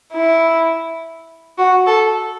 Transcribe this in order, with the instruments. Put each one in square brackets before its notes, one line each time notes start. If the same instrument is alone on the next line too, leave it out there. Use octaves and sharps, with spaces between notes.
[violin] E4
F#4
A4